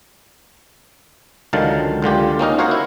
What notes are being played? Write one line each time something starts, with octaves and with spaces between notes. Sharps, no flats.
C#2 D3 D#3 F#3 F5 A5
C#2 D3 F4 G4
A#3 C#4 D#4 A#4
F#4 A#4 C5 C#5 F5 F#5
E4